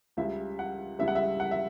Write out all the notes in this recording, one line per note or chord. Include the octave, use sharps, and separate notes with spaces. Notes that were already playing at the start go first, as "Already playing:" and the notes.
C#2 C#3 G3 E5
F#5
C#2 C#3 G3 E5
F#5
E5
F#5
E5